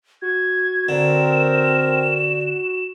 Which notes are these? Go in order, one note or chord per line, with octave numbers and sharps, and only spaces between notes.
F#4 G#6
D3 C4 A#4 E7